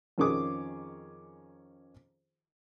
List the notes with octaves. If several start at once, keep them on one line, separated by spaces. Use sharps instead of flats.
F2 D#3 C#4 G#4 D6 D#6